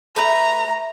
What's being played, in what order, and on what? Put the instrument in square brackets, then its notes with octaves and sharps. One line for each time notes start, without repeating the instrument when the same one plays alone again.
[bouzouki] A3 B4 E5 [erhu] A#5